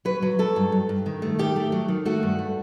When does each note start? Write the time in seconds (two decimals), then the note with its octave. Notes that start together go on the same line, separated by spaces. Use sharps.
0.05 F#3 B4
0.22 F#3
0.39 F#3 A4
0.56 G2
0.72 G2
0.89 G2
1.06 D#3
1.22 A3
1.39 D#3 G4
1.56 A3
1.72 F#3
1.88 D#3
2.05 A3 F#4
2.23 G2
2.39 A3